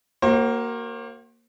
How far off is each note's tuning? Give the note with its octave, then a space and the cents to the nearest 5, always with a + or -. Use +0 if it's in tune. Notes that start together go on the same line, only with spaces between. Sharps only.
A#3 +0 F#4 +30 C5 +40